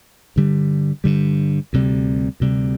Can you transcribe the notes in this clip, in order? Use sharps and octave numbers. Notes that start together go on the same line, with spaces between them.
G2 D3 G3
G2 D3 G3
D2 C3 G3
D2 C3 G3